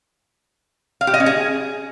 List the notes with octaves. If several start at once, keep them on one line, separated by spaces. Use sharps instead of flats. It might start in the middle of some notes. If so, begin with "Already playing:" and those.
F5
G4
D#5
C#4
G#4